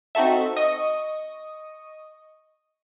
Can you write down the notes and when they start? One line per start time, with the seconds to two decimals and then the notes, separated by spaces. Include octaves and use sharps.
0.15 C4 D#4 F#4 A4 E5
0.56 D#5 C#6 D#6